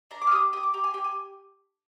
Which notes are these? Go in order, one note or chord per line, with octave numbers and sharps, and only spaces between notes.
D4 A#5
D6
F6
G4 D#6
G4 D#6
D6
G4 A#5
G#5
G4 G5
G#5